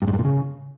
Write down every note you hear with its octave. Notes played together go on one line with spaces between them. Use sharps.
G2
G#2
G2
A#2
C#3